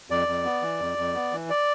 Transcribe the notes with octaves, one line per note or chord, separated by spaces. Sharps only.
F2 D5
F2
B3
E3
F2
F2
B3
E3
D5